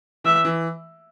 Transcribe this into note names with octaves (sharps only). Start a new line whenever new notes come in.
E3 E5
E3